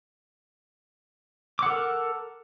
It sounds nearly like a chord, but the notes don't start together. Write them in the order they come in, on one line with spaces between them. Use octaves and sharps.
D6 F#5 A4 A#4